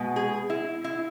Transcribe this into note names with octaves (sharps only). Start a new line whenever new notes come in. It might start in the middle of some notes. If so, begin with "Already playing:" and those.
Already playing: B2 G#3 B3
G#4
E4
E4